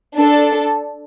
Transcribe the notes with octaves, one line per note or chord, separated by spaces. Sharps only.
D4 A4